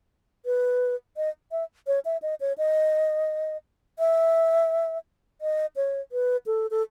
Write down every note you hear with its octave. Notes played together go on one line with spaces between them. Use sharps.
B4
D#5
E5
C#5
E5
D#5
C#5
D#5
E5
D#5
C#5
B4
A4
A4